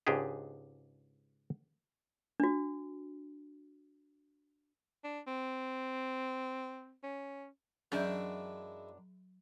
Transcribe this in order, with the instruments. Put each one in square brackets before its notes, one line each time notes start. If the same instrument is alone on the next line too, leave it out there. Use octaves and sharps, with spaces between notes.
[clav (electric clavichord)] C#2 G#2 D4 G4 G#4
[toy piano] D4 F#4
[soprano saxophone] D4
C4
C#4
[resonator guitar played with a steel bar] F#2 D4 [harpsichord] E3 G#3 E4 [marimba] F#3 D5 G6